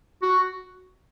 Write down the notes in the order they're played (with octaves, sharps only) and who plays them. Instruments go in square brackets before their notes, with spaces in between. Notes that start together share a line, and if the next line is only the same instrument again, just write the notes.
[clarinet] F#4